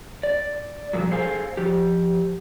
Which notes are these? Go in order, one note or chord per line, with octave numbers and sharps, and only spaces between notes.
D5
G2 A#2 F3 F#3
G#4 A4 C5 F5 G#5
F3 G4